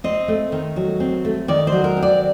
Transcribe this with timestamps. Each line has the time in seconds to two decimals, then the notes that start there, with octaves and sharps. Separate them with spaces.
0.04 C4 D#5
0.28 A3
0.52 D#3
0.76 F#3
1.00 C4
1.25 A3
1.48 D#3 D5
1.67 C5
1.72 F#3
1.84 A#4
1.97 C4
2.03 D5